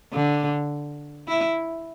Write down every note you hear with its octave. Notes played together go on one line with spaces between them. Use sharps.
D3
E4